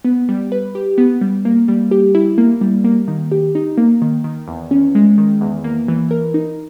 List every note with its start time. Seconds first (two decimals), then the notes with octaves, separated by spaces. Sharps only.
0.05 B3
0.29 G3
0.52 B4
0.75 G4
0.98 B3
1.21 G3
1.45 A#3
1.68 G3
1.91 G4
2.15 E4
2.38 A#3
2.61 G3
2.84 A#3
3.08 D#3
3.32 G4
3.55 D#4
3.78 A#3
4.02 D#3
4.24 D#3
4.48 E2
4.71 C#4
4.95 G#3
5.18 D#3
5.41 E2
5.64 A#3
5.88 E3
6.11 A#4
6.34 D#4